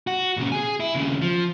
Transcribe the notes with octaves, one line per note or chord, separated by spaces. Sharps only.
F#4
A#2 C#3
G#4 G#5
E4
D#2 C#3
F3